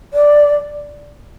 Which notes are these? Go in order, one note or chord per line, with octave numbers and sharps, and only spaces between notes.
D5